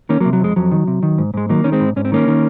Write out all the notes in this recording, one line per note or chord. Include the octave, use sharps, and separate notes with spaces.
D#3 A#3 C#4
F#3 A#3
C3
F#3
F2 G#3
F2 F#3
D#3
C3
D#3
G#2
G#2 G#3
D#3 F#3 A#3
D#3 C#4
G#3 C4
G#2
G#2 C#4
C4
D#3 A#3 C#4
D#3